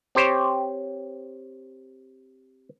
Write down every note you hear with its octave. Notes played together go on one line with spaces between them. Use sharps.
C4 G4 C5 C#5